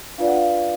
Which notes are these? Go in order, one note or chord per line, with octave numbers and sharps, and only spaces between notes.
D4 F4 B4 D5 F5
F#5
F5